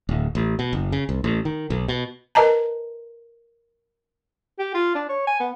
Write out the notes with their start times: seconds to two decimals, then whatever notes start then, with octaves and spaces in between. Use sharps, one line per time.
0.09 D1
0.35 A1
0.59 B2
0.73 F#1
0.92 C#3
1.09 C2
1.24 A1
1.45 D#3
1.70 B1
1.88 B2
2.35 A#4 B4 D#5 A5 A#5
4.59 G4
4.74 F4
4.95 D4
5.09 C#5
5.27 G#5
5.40 B3